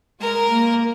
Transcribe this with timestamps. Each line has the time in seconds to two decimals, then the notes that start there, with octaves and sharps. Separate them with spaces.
0.20 G#3 A#4
0.49 A#3